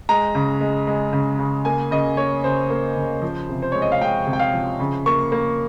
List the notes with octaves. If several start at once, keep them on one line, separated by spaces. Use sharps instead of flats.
G#3 A#5
C#3
G#3
G#3
C#3
C#3
A#3 G#5
C#3 D#5
A#3 C#5
C#3 C5
A#3
C#3
F3
C3
C5
G#3 C#5
D#5
F5
G#3 G5
C3
G5
F5
F3
C#3
A#3 C#6
A#3